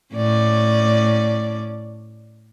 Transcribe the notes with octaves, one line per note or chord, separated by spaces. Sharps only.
A2 C#4 D5